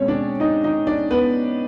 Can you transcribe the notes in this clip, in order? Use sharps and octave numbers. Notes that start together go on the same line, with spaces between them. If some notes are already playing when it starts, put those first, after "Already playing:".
Already playing: B2 G#3 C4 C#4 C#5
D4 D5
D#4 D#5
D#4 D#5
D4 D5
B3 B4